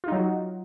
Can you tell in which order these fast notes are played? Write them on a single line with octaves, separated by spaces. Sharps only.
F4 D#4 F#3 F#4